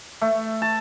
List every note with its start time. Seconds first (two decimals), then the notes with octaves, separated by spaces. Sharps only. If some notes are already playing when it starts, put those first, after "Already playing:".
0.21 A3
0.62 A5